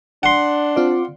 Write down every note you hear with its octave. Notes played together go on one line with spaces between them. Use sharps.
D4 F#5 C6
C4 F4 D5